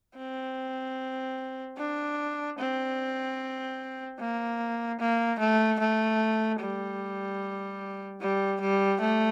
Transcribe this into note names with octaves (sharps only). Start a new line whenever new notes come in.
C4
D4
C4
A#3
A#3
A3
A3
G3
G3
G3
A3